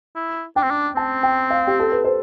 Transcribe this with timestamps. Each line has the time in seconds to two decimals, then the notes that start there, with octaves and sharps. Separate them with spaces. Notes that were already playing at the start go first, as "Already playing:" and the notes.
0.16 E4
0.56 D4 G5
0.63 C4
0.70 D4
0.96 C4 A5
1.23 G5
1.50 F5
1.67 G4
1.80 A4
1.92 B4
2.05 C5